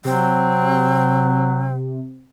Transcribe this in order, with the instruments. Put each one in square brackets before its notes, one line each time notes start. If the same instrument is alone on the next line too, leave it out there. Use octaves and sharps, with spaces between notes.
[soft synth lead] C3 [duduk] F#3 [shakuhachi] C4